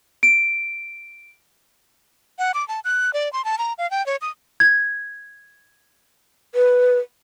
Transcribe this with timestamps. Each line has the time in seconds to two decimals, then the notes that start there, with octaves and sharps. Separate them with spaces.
0.23 D7
2.39 F#5
2.54 D6
2.68 A5
2.85 F#6
3.13 D5
3.33 C6
3.45 A5
3.58 A#5
3.78 F5
3.91 G5
4.06 C#5
4.21 D#6
4.60 G#6
6.55 B4